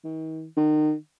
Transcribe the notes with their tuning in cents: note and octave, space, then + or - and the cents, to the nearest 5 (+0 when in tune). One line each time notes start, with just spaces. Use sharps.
D#3 +40
D#3 -30